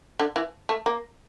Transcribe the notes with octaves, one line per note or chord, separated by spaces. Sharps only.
D3
E3
A3
A#3